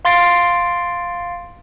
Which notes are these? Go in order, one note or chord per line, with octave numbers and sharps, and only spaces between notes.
F5 C6 A6 C7 D7